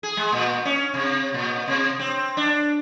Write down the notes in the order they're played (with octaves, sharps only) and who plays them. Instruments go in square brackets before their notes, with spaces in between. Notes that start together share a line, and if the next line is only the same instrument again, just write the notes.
[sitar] G#4
G#3
A#2
C#4
C3
A#2
C3
C4
D4